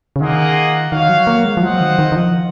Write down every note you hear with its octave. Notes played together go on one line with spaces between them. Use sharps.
C#3
D#3 A#3 F4 G#4 D#5 F#5
D#3 F#4 C#5 F5
F#3
A#3
G#3
F3
F#3 C4 F4 C5 D#5 F#5
D#3
D#3
D#3
F3